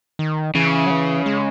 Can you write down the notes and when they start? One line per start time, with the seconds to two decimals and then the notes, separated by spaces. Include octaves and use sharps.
0.19 D#3
0.55 C#3 E3
0.86 F#3
0.90 E3
1.26 G#3